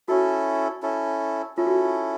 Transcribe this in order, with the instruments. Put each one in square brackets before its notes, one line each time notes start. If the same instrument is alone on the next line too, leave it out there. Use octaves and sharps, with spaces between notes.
[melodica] C#4 E4 A4 [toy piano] F#4
[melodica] C#4 E4 A4
[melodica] C#4 E4 A4 [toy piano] F4
[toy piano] F#4
F4